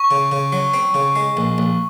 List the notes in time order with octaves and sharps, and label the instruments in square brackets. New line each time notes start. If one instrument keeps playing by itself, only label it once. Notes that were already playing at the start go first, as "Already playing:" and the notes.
Already playing: [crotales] C#6
[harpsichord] C#3
C#3
F#3
C4
C#3
G#3
A#1
A#1